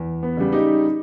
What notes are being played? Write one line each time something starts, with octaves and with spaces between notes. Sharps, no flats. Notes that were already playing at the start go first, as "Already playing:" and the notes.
Already playing: E2
B3
C#3 G3
D#4 G4